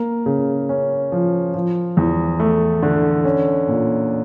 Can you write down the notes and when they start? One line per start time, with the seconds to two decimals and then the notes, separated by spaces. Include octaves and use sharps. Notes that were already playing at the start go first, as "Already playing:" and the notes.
Already playing: A#3
0.26 C#3
0.69 C#4
1.12 F3
1.54 F3
1.97 E2
2.40 A3
2.83 D3
3.25 C#4
3.68 A#2